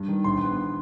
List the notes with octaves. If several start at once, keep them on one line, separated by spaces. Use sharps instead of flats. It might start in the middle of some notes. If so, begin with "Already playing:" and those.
Already playing: G2
D#3
A#1 C6
B3